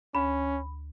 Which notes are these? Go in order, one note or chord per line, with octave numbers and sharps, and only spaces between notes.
D2 C#4 B5